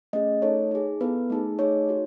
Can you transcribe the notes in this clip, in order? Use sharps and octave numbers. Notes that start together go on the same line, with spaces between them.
A3 C#4 G#4 D#5
A3 D#4 A4 C#5
D#4 G#4
B3 E4 A4 B4
A3 D#4 G#4
A3 D#4 G#4 C#5
D#4 F#4